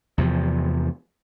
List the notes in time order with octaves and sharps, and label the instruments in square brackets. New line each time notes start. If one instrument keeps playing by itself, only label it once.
[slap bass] E2 C3 F3